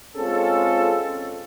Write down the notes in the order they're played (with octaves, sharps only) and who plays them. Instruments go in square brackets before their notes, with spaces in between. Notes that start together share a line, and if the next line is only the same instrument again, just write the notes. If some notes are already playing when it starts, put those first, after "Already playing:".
[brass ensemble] G#3 C4 C#4 F4 G#4 A4